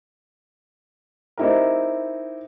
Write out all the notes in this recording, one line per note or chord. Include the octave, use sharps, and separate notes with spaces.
C4 D#4 E4 G4 A#4